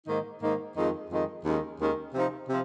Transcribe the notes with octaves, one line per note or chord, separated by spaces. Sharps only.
G#2 D#3 A#3 D#4
G#2 D#3 A#3 D#4
F2 D#3 G#3 D#4
F2 D#3 G#3 D#4
D#2 D#3 G#3 C#4
D#2 D#3 G#3 C#4
C3 F3 C4 D#4
C3 F3